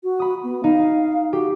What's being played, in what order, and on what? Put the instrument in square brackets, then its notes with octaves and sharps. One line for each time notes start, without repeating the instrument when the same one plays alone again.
[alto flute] F#4
[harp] B5 D#6
[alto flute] B3
[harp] D#4 [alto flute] F5
[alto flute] F#4 [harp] G4